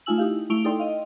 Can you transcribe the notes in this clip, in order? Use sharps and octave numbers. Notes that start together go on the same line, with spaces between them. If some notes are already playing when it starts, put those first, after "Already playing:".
A3 D#4 F4 G#5 E6 F#7
D#4 E4 G4 F5
A3 E4 C#6 D7 F7 G7
D#4 E4 A4 D5 G5 C6
D#5 F5